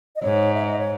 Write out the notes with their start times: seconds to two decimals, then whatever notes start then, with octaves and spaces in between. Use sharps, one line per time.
0.16 D#5
0.23 G#2 C#5
0.54 E5
0.67 D#5
0.79 C#5